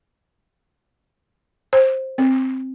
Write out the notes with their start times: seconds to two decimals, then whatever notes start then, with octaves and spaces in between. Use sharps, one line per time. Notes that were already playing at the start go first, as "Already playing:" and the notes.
1.73 C5
2.18 C4